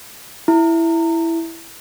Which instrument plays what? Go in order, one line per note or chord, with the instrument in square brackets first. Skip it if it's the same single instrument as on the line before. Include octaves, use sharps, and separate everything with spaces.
[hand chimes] E4